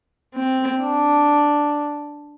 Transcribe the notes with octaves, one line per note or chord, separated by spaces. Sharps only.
C4
D4